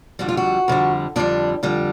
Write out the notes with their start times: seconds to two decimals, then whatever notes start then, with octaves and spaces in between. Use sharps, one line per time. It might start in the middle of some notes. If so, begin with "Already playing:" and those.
0.19 F2 D3 G3 F#4
0.29 F4
0.37 F#4
0.68 F2 D3 G3
1.16 F2 D3 G3 D4
1.63 F2 D3 G3